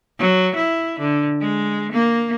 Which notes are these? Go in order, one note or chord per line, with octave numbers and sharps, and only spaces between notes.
F#3
E4
D3
G#3
A#3